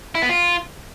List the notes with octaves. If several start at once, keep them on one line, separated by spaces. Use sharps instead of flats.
E4
B3
F4